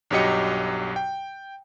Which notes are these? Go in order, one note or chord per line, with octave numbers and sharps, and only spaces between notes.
B1 G2 F#3 G4 D#5 C#7
G5